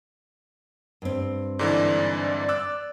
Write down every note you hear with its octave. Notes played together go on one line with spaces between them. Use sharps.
G2 C4
G#2 D3 E3 D5
D6 E6 F#6